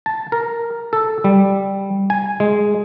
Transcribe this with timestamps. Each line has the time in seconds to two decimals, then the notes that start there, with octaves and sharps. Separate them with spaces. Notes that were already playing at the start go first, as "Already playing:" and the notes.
0.06 A5
0.32 A#4
0.93 A4
1.24 G3
2.10 G#5
2.40 G#3